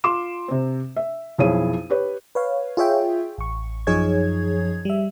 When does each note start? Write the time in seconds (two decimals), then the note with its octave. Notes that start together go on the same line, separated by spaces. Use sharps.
0.04 F4 C6 D6 E7
0.48 C3 C4
0.96 E5
1.38 B1 F2 E4 G#4 C#5 D#7
1.90 G4 B4 C#5
2.35 B4 C#5 F5
2.77 F4 G#4 C#5 E5 G5
3.38 A1 C#6
3.87 F#2 F3 D#4 G#4 C#5 G#6
4.85 G3 E5